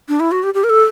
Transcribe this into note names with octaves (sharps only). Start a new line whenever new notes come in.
D4
E4
F#4
G4
G4
A#4
A4